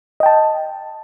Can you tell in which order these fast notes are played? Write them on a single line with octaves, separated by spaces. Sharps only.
D#5 G5 A5